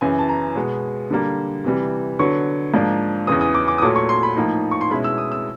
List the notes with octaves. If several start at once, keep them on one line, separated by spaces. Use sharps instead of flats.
F#2 C#3 E3 G#5
A5
A#5
B2 G#3 B3
D3 G3 A#3
C3 E3 G3
D3 F#3 B3 C#6
G#2 F3 A#3 D4
E2 C#3 E3 D#6
D#6
D6
D6
D#6
A#2 F#3 A3 D6
C#6
C6
B5
A2 F3 A#3 D#4
C#6
C6
B2 G#3 C#4 E4 B5
E6
D#6
E6